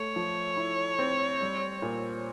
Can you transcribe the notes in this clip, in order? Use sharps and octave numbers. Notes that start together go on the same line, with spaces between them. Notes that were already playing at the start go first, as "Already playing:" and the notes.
Already playing: A3 C#5
F3
E4
C4
G3
A#2